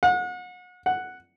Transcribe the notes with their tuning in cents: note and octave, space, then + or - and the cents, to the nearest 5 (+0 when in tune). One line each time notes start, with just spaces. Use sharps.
F#5 -35
F#5 +0